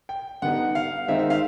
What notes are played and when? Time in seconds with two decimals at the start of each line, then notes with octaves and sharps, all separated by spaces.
0.09 G5
0.42 D3 G3 B3 D#4 F#5
0.75 F5
1.08 D#3 G#3 C4 D#4 E5
1.19 E5
1.30 F5